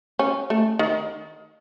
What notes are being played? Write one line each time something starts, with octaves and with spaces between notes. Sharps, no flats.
C#4
A3
D#3